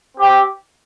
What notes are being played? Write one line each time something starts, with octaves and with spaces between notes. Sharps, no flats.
C4 G4